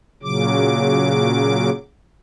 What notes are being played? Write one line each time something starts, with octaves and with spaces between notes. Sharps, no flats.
A#2 C#3 F#3 D6